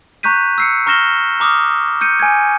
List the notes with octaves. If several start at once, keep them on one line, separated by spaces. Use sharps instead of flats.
A#5 C#6 F#6 G6 B6 D#7
E6 C7 C#7
A#5 C#6 F6 A#6 E7 G7
A#5 D6 D#6 F6
G6 C#7 D#7
G#5 G#6